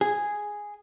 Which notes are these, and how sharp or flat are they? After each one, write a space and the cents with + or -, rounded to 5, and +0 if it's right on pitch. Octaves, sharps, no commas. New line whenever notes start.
G#4 -5